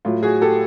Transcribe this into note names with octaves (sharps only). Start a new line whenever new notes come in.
A2 F#3 F4
F#4 G#4
G4 A4